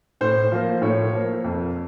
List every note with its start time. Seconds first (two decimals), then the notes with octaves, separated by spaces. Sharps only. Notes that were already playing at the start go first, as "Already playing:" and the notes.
0.21 A2 C5
0.52 F3 A#3
0.82 A2 C#5
1.13 F3 A#3
1.44 F2